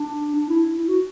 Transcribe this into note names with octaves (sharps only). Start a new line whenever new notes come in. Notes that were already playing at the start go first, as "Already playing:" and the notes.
Already playing: D4
D4
E4
E4
F#4